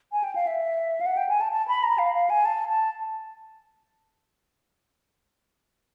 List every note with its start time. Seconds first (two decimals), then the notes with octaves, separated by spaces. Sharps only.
0.12 G#5
0.24 G5
0.35 F5
0.47 E5
1.01 F5
1.06 F#5
1.17 G5
1.29 G#5
1.41 A5
1.52 A5
1.68 B5
1.83 A#5
1.99 F5
2.15 F5
2.30 G#5
2.45 A5
2.69 A5